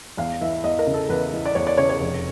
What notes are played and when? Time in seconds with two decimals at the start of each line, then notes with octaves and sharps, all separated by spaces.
0.17 E2 F5
0.41 E3 E5
0.64 E2 D#5
0.79 A#4
0.86 C#3
0.94 A4
1.09 E2 B4
1.33 E3
1.45 D5
1.55 E2 C#5
1.67 D5
1.78 C#3 C#5
1.89 C#5
2.00 F1